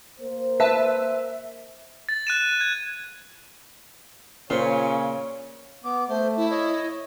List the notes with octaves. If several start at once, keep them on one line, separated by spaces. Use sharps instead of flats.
A#3 A#4 C5
B4 E5 A5
A6
F#6 D#7 E7
G#6
A#2 C#3 F4 C5 C#5
B3 D6
A3 C5
E4
C#5 D#5